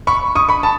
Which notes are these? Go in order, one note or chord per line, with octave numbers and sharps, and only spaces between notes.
B5 C#6
C#6 D#6
B5 C#6
A5